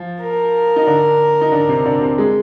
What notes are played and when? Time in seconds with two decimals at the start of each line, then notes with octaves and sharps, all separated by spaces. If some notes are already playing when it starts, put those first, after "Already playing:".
Already playing: F3
0.21 A#4
0.76 D#4
0.86 D3 D4
1.41 D#4
1.52 D3 D4
1.69 C3 C4
1.86 D3 D4
2.01 C3 C4
2.18 G#3